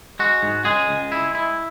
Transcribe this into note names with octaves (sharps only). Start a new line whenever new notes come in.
G#3 F#4
G#2
C#2 G#3 G#4
C#2
E4
E4